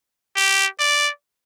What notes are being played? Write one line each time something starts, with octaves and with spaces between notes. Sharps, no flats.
G4
D5